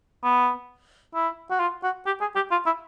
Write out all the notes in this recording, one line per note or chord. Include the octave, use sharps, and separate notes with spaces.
B3
E4
F#4
F4
F#4
G4
G#4
G4
F4
E4